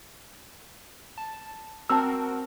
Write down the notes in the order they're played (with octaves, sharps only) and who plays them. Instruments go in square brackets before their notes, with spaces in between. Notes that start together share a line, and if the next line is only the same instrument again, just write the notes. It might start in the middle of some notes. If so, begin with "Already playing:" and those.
[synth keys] A5
[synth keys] C4 F#4 A#4 [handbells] A5 E6